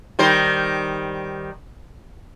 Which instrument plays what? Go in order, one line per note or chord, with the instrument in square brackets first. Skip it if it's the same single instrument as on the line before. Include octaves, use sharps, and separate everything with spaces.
[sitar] D#3 G3 C5